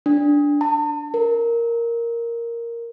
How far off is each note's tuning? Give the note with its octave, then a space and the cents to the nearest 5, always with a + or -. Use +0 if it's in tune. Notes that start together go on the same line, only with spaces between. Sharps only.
D4 -10
A5 +40
A#4 +0